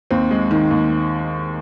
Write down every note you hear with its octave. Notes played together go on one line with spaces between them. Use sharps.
D#2 C4
G#3
D#3
D#2